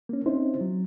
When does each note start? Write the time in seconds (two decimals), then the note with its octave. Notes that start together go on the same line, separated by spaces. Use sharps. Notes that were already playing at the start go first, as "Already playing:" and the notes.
0.09 A#3 C#4
0.26 C4 C#4 D#4 E4 C5
0.61 F#3